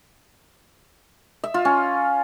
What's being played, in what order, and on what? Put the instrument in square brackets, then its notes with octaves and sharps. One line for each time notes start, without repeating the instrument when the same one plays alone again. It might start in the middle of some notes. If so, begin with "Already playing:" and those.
[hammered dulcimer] E5
F4
C#4